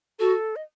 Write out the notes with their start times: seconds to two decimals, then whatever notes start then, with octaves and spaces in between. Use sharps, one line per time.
0.19 F#4 A4
0.56 D#5